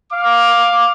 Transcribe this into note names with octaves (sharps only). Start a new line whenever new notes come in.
F5 D6